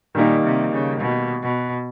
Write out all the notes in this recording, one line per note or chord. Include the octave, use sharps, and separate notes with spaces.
A#2 D#3 G3 A#3 D#4
C3
C#3
B2
B2